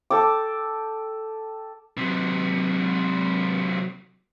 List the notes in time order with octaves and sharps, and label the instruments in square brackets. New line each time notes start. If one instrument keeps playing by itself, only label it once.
[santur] A4 G5 D6
[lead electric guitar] C3 F#3